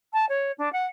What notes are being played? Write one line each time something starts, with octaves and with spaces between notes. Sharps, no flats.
A5
C#5
D4
F#5